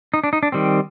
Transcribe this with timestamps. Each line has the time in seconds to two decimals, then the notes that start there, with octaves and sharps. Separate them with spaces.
0.14 D#4
0.24 D4
0.33 D#4
0.43 D4
0.52 D#3 G3 C4